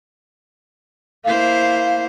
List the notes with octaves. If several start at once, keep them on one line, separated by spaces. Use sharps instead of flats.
A#3 E4 C5 F5